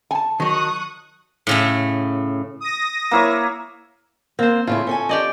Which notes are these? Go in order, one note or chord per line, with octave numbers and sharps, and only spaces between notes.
G#5 A5
D#3 F#3 C#6 D#6 F#6
A2 C#3 A3
D#6 A#6
A#3 E4 C#5
A#3 C4 C5
A2 C#3 E4 F4
C#4 A4 G#5
G4 D5 D#5